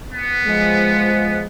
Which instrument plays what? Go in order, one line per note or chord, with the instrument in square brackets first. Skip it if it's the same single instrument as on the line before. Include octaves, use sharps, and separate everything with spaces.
[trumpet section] B3
[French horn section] F3 G#3